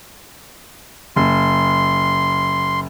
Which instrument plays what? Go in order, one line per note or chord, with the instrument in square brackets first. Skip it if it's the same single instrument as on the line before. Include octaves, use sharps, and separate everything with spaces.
[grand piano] F#1 [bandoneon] C6